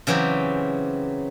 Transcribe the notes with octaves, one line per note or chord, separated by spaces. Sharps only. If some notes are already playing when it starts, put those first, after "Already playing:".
C#3 E3 F#3 C4 G4